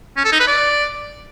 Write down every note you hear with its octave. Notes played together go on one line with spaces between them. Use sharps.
C#4
A4
D#4
B4
D5